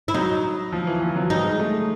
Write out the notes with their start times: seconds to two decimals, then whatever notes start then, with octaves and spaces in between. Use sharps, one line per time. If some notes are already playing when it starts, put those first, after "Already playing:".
0.08 E4
0.14 F#3 D#4
0.72 F3
0.87 E3
1.02 F3
1.16 F#3
1.30 G3 D#4
1.44 G#3
1.60 A3